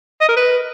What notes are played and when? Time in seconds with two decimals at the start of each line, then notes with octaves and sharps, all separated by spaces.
0.21 D#5
0.29 A#4
0.37 B4